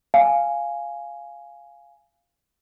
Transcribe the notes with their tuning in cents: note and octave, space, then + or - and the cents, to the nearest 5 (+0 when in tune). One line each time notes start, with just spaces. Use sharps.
F5 -5 G#5 +0